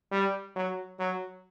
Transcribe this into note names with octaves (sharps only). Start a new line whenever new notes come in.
G3
F#3
F#3